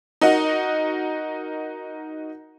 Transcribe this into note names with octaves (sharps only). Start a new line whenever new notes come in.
D#4 F#4 A#4 D#5 F#5